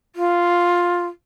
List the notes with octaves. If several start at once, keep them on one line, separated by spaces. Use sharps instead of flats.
F4